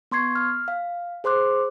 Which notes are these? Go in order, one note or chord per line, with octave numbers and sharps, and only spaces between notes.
B3 C6 C#6 G#6 C7
F6
F5
G#4 C5 C6 D6 F#6